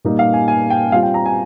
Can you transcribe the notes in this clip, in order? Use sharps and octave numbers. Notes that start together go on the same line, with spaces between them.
A#2 G3 A#3 D#4
F5
G#5
G#5
G5
G3 C4 F4 F5
G5
A#5
G#5